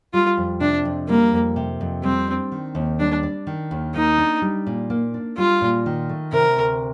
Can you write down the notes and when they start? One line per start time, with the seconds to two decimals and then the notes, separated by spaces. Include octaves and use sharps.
0.14 G3 F4
0.37 F2
0.60 C3 D4
0.85 F2
1.09 G3 A#3
1.32 F2
1.56 C3
1.81 F2
2.03 G3 C4
2.28 D4
2.52 D#3
2.75 D#2
2.99 G3 D4
3.23 D4
3.47 D#3
3.71 D#2
3.95 A#3 D#4
4.18 D4
4.42 G3
4.67 A#2
4.90 A#3
5.14 D4
5.38 G3 F4
5.61 A#2
5.86 D#3
6.09 A3
6.32 C3 A#4
6.57 D2